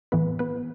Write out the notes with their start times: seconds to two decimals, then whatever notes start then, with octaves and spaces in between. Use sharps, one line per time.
0.12 A2 E3 A3 B3 B4
0.39 B3 B4